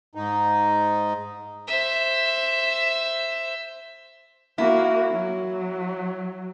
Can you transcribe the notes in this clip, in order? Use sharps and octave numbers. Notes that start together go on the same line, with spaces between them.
G#2 D#4
C5 E5
A#3 E4 F#4
F#3